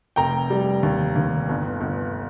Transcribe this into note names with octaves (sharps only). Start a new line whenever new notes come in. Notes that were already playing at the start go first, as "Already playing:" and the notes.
F1 G5 A#5
G3
D#2
D#2
G1
G1